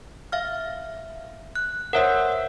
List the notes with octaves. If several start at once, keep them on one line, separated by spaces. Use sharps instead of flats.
E5 F5 F6
F#6
A#4 C5 C#5 E5 F#5 E6